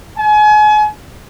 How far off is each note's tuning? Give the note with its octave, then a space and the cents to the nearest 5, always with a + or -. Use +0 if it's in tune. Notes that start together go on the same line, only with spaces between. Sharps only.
G#5 +35